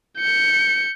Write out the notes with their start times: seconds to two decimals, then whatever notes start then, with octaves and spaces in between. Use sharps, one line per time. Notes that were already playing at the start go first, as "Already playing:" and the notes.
0.18 G6 C#7